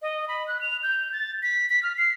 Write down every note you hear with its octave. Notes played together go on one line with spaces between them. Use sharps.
D#5
B5
F#6
F7
G6
A6
B6
B6
F6
C7